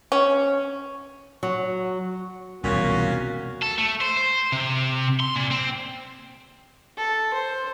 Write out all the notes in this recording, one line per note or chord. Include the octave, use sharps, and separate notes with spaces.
C#4
F#3
E1 C2 A#2 A#3 C#4 F#4
A4
A3
C5
C5
C3
C6
A#2
C4
A4
C5